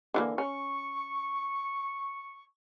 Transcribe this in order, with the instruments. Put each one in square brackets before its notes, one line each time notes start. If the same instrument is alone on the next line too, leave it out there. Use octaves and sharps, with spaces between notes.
[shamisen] D3 E3 A#3
[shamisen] C#4 [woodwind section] C#6